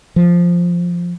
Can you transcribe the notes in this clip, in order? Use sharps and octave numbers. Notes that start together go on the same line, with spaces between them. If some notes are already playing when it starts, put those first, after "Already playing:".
F3